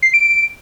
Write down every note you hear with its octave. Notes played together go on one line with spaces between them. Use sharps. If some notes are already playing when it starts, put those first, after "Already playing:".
C7
D7
D7